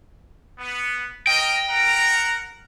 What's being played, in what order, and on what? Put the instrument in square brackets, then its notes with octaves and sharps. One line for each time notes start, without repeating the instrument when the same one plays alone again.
[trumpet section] B3
[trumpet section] A#4 D#5 [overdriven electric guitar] G5
[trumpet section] A#4 F#5 A#5